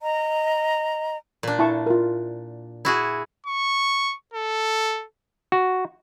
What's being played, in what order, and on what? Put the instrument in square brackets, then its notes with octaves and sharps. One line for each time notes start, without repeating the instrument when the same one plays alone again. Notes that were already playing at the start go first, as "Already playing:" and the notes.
[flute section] D#5 A#5
[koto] A#2 D4
[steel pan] E4 A5 C#6
F4 A#4
[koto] E4 F#4 G#4
[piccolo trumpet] C#6
A4
[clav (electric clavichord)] F#4